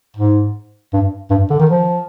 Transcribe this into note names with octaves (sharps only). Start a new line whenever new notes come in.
G#2
G2
G2
D3
D#3
F3